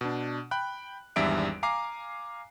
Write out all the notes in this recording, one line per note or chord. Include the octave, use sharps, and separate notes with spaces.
B2 D4
G5 B5 F#6
G#1 E2 G3 D4 E5 D7
F5 G#5 A#5 D6 C7